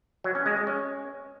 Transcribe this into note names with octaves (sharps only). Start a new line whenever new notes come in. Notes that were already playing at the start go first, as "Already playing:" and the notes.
F#3
C#4
G#3
G#3
C#4